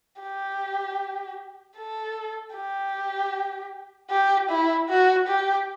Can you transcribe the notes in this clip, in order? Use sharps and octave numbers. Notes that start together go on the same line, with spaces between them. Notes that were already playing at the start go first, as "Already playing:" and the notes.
G4
A4
G4
G4
E4
F#4
G4